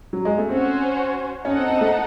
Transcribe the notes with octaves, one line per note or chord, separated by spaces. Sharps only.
F#3
G#3
A3
C4 C#4 F#4 C5
C#4 D#4 A4 D#5 F#5
C4
C4
A3